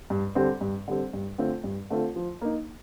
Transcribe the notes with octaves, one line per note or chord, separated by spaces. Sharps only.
G2
D3 G3 C4
G2
D3 G3 C4
G2
D3 A3 C4 F4
G2
D3 A3 C4 F4
F3
A#3 D#4